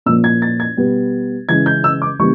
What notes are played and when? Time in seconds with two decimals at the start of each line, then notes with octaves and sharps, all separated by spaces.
0.06 A#2 F3 A#3 E6
0.24 G#6
0.42 A6
0.60 G#6
0.77 B2 G3 B3
1.49 C#3 E3 G#3 G#6
1.66 G6
1.84 E6
2.02 D6
2.19 C#3 E3 G3 A#3 C#6